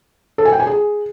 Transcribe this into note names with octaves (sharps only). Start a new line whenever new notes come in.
A4
G#5
G5
G#5
G#4